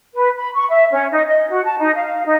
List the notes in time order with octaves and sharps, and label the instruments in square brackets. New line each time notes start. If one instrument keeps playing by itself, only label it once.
[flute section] B4
B5
C#6
E5
C#4
D#4
D#5
F#4
A5
D#4
F5
D#4